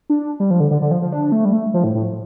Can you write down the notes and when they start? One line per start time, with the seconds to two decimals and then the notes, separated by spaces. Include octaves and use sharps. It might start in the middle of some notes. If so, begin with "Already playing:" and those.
0.10 D4
0.40 G3
0.51 F3
0.60 D3
0.71 D3
0.82 D3
0.91 F3
1.02 F3
1.12 D4
1.32 A3
1.45 G3
1.53 A3
1.74 F3
1.84 A2
1.95 A2